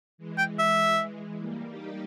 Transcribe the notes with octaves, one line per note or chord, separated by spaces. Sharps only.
E3 G#3
G5
E5
G3 A#3
D#4 G4